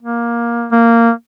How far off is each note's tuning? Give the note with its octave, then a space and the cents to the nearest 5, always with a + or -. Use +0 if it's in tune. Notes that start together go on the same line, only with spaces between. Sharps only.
A#3 +15
A#3 -10